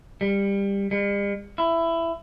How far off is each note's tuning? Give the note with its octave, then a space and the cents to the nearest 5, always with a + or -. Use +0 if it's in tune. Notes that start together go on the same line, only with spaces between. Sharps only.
G3 +20
G3 +45
E4 +15